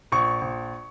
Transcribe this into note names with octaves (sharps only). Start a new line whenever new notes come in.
A#1 C#6
A#1